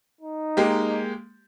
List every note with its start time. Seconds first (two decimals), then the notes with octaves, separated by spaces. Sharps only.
0.21 D#4
0.57 G#3 A#3 G4